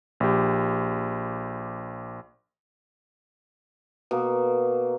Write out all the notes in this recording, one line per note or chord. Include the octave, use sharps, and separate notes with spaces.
A#1 G4
B2 A#3